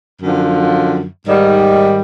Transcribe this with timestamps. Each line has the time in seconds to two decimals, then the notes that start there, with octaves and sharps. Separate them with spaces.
0.22 F#2 D3 F3
1.27 G#2 D#3 G3